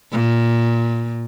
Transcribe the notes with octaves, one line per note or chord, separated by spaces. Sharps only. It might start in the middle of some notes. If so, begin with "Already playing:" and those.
A#2